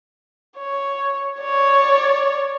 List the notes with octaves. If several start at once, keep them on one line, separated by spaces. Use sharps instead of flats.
C#5
C#5 D5